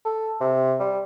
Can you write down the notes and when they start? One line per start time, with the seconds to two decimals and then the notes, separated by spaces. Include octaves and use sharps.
0.05 A4
0.41 C3
0.80 G3